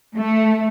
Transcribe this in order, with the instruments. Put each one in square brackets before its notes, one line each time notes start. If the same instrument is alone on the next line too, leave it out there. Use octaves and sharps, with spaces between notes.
[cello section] A3